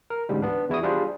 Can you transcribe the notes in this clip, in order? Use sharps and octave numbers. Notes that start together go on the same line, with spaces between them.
A#4
A1 D2 G#2 G3
B3 D4
E2 E4 F#4 D#6
G3 D4 F4 G#4 C5